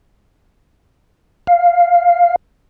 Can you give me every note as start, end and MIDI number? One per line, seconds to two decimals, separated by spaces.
1.47 2.36 77